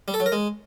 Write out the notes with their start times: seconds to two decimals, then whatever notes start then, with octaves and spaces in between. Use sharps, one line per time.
0.08 G3
0.14 A4
0.20 F#3
0.26 A#4
0.32 G#3